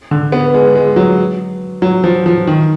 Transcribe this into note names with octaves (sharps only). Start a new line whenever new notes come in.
D3
B3
G#3
G#3
F#3
F#3
F3
F3
D#3